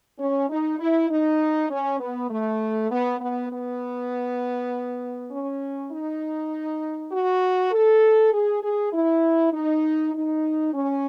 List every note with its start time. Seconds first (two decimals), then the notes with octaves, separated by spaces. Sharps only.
0.19 C#4
0.50 D#4
0.80 E4
1.10 D#4
1.70 C#4
2.00 B3
2.30 A3
2.91 B3
3.20 B3
3.50 B3
5.31 C#4
5.91 D#4
7.12 F#4
7.72 A4
8.33 G#4
8.62 G#4
8.92 E4
9.53 D#4
10.14 D#4
10.74 C#4